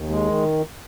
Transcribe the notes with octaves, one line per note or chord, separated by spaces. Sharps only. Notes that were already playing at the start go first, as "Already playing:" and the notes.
Already playing: D#2
G#3
D#3